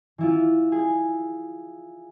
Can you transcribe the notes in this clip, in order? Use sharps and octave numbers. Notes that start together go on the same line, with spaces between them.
E3 E4 F4
G#4